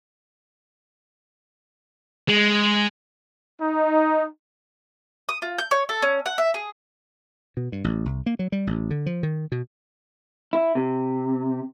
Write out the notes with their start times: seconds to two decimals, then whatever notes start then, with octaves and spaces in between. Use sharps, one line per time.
2.29 G#3
3.60 D#4
5.29 D#6
5.42 F4
5.59 G6
5.71 C#5
5.89 A4
6.02 C#4
6.26 F#5
6.38 E5
6.54 G#4
7.57 B2
7.72 G2
7.84 A1
8.06 C2
8.26 A#3
8.39 F#3
8.52 G3
8.67 A1
8.90 D3
9.06 F3
9.23 D#3
9.52 B2
10.53 E4
10.75 C3